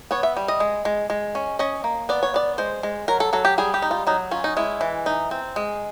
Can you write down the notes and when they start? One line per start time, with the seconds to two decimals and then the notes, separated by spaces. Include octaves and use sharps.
0.11 B3 C#5
0.23 E5
0.37 G3
0.48 D#5
0.60 G#3
0.85 G#3
1.10 G#3
1.35 C#4
1.59 C#4 D#5
1.84 A#3
2.09 B3 D5
2.23 C#5
2.34 B3 D5
2.58 G#3 C5
2.83 G#3
3.08 F#3 A#4
3.20 A4
3.33 F#3 A4
3.45 G4
3.58 G3 G#4
3.74 G4
3.82 D#4
3.91 F4
4.07 F#3 D#4
4.31 C#4 F4
4.44 D#4
4.57 G#3 E4
4.81 E3
5.06 D#4
5.31 C4
5.56 G#3